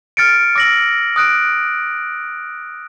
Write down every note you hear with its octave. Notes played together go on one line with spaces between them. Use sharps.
F6 A6 C#7 D7
D6 E6 A#6 D7 F#7
D#6 F#6 D7